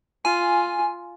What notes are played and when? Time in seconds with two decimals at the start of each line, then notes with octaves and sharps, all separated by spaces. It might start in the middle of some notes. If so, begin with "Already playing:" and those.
0.25 F4 G#5